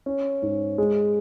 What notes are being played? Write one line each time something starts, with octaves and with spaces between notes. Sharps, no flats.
C#4
G#2
G#3